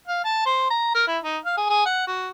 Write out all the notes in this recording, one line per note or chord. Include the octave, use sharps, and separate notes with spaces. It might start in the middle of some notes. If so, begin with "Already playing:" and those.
F5
A5
C5
A#5
A#4
E4
D#4
F5
G#4
G#4
F#5
F#4